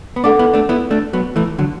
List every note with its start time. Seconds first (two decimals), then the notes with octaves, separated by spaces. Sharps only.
0.16 B3
0.24 A3 D4 A4 F#5 D6
0.39 B3 E4
0.54 A3 D4
0.69 B3 E4
0.91 A3 D4
1.13 F#3 B3
1.36 E3 A3
1.58 D3 F#3